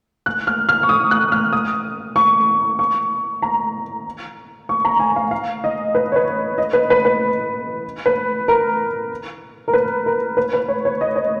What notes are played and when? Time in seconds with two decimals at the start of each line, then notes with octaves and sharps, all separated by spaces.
0.26 F#6
0.47 F6
0.69 F6
0.83 C#6
0.89 D#6
1.11 F#6
1.32 F6
1.53 D#6
2.16 C#6
2.79 C#6
3.42 A#5
4.69 C#6
4.85 A#5
5.00 G#5
5.16 F5
5.31 F5
5.64 D#5
5.95 B4
6.12 C#5
6.16 B4
6.58 D#5
6.73 B4
6.90 B4
7.05 B4
8.06 B4
8.48 A#4
9.68 A#4
9.73 B4
10.06 A#4
10.37 B4
10.53 B4
10.68 C#5
10.85 C#5
11.01 D#5
11.16 C#5